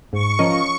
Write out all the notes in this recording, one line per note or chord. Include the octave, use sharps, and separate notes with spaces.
G#2 C#6
F3 C#4 A#4 D#5